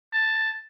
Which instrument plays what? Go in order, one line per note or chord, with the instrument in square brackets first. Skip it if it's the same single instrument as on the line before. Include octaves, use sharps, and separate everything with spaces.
[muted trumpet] A5